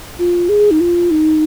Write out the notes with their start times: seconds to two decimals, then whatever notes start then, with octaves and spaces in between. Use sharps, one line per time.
0.19 F4
0.49 G#4
0.71 D#4
0.80 F4
1.11 D#4